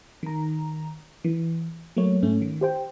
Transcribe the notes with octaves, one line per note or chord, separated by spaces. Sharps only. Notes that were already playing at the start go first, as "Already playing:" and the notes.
D#3 A#5
E3
F#3 A3 A#3 C#5
G#2 A3 C#4
D#3
G4 C5 G5